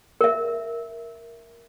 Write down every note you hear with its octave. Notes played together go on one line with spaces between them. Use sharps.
A#4 E5